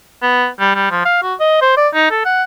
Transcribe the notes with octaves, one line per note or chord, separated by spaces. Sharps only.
B3
G3
G3
F3
F5
F#4
D#5
C5
D5
D#4
A4
F#5